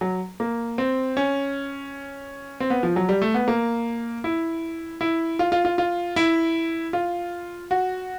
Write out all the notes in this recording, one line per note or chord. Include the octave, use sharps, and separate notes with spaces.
F#3
A#3
C4
C#4
C4
B3
F3
F#3
G3
A3
B3
A#3
E4
E4
F4
F4
F4
F4
E4
F4
F#4